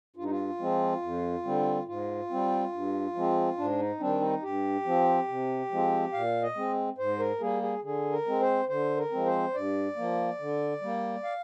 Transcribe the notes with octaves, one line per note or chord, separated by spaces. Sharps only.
G2 F4
D#4
F4
F3 G#3 C4
F2
D3 G3 C4
G#2 F4
G3 C4
G2
F3 G#3 C4
G#2 D4
D#4
D#3 G3 C4 D4
D#4
G2 G4
F3 C4
C3
F3 G#3 C4
A#2 F5
D#5
G#3 C4
G#2 C5
A#4
G3 A#3 G#4
G#4
D3 G#4
A#4
G#3 C4
C5
D3 C5
A#4
F3 G#3 C4
C5
G2 D5
F3 A#3
D3
G3 A#3
F5